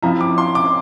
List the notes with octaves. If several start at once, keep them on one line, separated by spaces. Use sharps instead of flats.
F3 C4 E4 A#5
D6
C6
D6